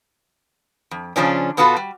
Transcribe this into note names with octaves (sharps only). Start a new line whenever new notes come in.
F2
C#3 F3 C#4 D4
B2 B3 F4 F#4 A4
G3